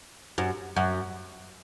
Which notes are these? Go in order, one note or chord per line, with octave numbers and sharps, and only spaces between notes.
F#2
F#2